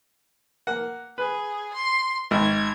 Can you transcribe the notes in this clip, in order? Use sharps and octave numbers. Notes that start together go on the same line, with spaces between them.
A#3 F#5
G#4 B4
C6
G#1 G#6